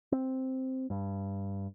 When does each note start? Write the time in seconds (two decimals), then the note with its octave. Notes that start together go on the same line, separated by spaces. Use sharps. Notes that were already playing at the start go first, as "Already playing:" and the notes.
0.12 C4
0.90 G2